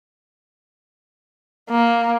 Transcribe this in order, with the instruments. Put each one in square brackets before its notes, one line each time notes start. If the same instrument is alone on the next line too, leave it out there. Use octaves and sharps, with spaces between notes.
[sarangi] A#3